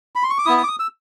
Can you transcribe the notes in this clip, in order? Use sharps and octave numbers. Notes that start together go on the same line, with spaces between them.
B5
C6
C#6
D6
B3 E4 D#6
D#6
D6
D#6
E6